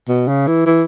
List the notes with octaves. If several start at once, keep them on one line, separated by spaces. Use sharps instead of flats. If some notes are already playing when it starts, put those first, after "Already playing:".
B2
C#3
E3
E3